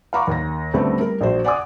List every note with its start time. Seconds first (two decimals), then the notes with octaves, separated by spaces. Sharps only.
0.13 F5 F#5 A#5 B5 C#6 D6
0.27 D#2 A#6
0.74 D2 C#3 G3 A3 B3 C4
1.01 G3 A#4
1.21 A#1 F#4 C5
1.44 D5 F#5 G#5 C6 D6 D#6